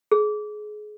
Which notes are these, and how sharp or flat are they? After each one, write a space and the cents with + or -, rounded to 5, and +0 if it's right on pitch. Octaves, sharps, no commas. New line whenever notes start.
G#4 +25